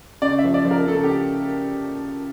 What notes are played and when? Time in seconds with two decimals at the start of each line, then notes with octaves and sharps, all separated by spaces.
0.22 C#3 D5
0.39 E5
0.44 F3
0.54 D5
0.65 F3
0.71 A#4
0.87 C#3 A4
1.04 G4